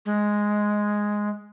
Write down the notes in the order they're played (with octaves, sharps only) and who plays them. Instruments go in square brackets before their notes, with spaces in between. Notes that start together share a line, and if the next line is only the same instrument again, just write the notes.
[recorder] G#3